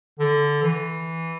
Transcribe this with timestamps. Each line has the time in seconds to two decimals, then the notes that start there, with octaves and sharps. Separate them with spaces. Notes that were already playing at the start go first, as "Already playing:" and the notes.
0.20 D3
0.63 E3